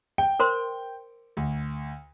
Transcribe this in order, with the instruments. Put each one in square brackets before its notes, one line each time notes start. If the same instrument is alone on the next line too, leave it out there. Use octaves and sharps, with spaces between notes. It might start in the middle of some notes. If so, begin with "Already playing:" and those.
[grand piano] G5
[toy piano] A#4 C5 C6
[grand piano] D2